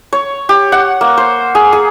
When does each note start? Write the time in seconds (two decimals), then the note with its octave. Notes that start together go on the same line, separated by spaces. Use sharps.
0.13 C#5
0.49 G4
0.72 F#5
1.01 A#3
1.17 C5
1.55 G#4
1.73 G#4